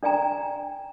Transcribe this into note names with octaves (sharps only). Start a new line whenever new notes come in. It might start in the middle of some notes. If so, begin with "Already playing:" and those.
D4 D5 G5 G#5 A#5